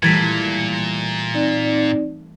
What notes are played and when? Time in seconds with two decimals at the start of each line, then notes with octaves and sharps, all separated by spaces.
0.03 A#2 E3 G3 A3 G#6 A6 B6
1.34 C4 D#4 D5